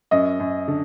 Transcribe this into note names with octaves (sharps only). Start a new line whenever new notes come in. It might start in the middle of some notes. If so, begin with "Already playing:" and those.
F#2 D#5
F#2
D3